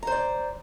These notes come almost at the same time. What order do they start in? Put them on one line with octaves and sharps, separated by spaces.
A#5 C5 D5